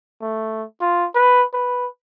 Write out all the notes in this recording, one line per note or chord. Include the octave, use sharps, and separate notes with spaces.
A3
F4
B4
B4